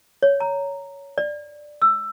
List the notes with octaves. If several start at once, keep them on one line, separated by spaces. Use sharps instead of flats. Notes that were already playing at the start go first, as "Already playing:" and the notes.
C#5
A#5
D5
E6